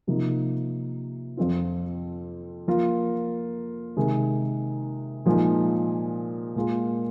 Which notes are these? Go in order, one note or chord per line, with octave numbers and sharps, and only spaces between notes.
C3 F3 A#3 D#4
F2 F3 C4 F4
F3 A#3 F4 A#4
C3 D#3 G#3
A#2 F3 G#3 D#4
A#2 G#3 F4 A#4